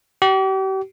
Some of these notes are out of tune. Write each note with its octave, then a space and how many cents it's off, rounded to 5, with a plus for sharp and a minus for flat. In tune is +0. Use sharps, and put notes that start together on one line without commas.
G4 -40